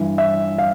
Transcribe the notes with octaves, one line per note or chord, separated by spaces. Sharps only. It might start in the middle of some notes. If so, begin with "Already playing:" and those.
Already playing: G2 E3
E5
F5